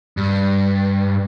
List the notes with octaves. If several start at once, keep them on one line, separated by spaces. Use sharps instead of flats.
G2